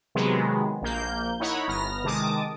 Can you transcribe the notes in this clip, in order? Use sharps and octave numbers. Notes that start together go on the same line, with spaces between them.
C3 D#3 F#3 G#3 B3
A#1 A#3 G6
D#4 E4 C#5 F#5 B5
G1 B3 F6 A#6
C3 D#3 G#3 A5 D6 D#6